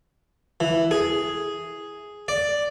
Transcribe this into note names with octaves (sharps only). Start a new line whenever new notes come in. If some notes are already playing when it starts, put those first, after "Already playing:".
E3
G#4
D5